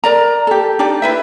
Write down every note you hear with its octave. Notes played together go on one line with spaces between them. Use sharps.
A#4 D5 A#5
G4 A4
D4 D#4 G4 D5
E4 B4 E5